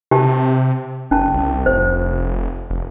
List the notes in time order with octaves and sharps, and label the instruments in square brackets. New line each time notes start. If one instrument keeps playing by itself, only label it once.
[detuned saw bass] C3 [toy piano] G4 A5
[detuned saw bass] F#1 [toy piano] C#4 A5
[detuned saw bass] C2
[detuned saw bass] F1 [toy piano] C5
[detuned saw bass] F1